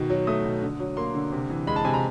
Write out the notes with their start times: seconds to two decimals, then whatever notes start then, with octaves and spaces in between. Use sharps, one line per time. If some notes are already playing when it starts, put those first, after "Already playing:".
Already playing: B2 D#3
0.10 F#3
0.27 A3 D#6
0.44 B2
0.63 D3
0.80 F#3
0.97 A#3 C6
1.15 D3
1.32 C3
1.50 E3
1.67 G#3 B5
1.76 A5
1.85 C3 G#5
1.94 A#5